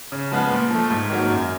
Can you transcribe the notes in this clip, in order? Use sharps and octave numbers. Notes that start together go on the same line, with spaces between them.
C#3
F3 G#3 B3
A#2
F3 A3
G#2
D#3 F#3 A#3
F#2